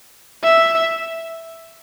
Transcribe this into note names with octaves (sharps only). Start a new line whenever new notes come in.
E5